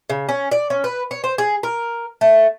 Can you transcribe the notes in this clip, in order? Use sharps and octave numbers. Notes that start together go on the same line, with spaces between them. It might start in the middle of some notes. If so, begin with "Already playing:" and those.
C#3
C#4
D5
C#4
B4
C#5
C5
G#4
A#4
A3